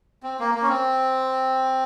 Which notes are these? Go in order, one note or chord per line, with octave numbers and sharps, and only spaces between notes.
C4
A#3
A#3
C#4
C4